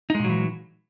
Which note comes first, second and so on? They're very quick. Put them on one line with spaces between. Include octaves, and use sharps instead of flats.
D#4 G#3 A#2 F#3 E3